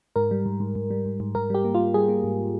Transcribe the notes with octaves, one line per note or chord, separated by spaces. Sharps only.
G#2 A#4
G3
G#2
G#2
G#2
G3
G#2
G#2
G#2 A#4
G3 G4
A#3
F4
G3
G3 G#4
A#3
G#2